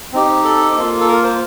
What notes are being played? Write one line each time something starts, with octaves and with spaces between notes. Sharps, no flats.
C4 D#4 G4
A4
A#3 F4
A4
A#4
C5